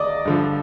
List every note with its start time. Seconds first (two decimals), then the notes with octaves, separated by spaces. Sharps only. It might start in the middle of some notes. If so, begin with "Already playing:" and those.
Already playing: D2 D5 D#5 D6 D#6
0.25 G2 D3 F3